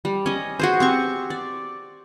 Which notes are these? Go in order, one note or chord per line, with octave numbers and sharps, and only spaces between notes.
G3
C#4 D#5
F#4 G#4 C5
C4 G4 C#6
D5